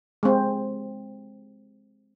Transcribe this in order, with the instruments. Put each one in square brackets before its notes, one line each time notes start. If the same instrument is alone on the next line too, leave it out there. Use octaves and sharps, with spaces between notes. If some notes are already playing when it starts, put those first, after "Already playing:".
[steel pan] G#3 C4